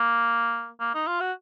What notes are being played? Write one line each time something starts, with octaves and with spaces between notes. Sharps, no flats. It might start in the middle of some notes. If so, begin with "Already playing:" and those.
Already playing: A#3
A#3
D#4
F4
F#4